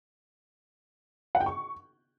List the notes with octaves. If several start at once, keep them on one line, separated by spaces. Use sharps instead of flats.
F#5
G5
C#6